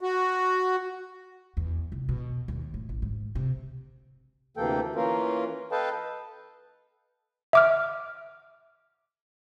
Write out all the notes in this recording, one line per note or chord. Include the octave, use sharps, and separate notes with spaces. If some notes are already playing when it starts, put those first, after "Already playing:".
F#4
E2
C2
B2
D#2
A2
A1
G#2
C3
D2 C3 E3 A#3 A4 G5
E3 A#3 C#4 F4 A#4
A4 B4 D#5 F5 G5 A5
E5 D6 F6